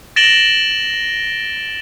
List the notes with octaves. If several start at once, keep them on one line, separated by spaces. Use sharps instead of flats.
A6 A#6 D7 E7 F#7 G7